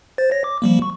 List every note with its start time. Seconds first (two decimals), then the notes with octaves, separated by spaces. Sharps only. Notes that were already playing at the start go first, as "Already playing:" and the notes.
0.18 C5 A6
0.31 C#5 A#6
0.44 D6
0.62 F3 G3 A#3
0.82 C#6